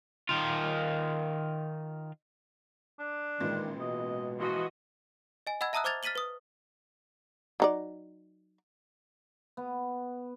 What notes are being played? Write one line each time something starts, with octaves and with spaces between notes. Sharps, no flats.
D#3 F4
D4
A1 A#2 D#3 G#3
B2 D#5
E3 F3 F#4 D#5
D#5 G#5
D#5 F#5 B5 E6 G#6
E5 A5 A#5 D#6 E6 F#6
C5 D6 F6 G#6 A6 F7
F6 A6 B6 D#7 F#7 G7
B4 D#6
F#3 D#4 D5
B3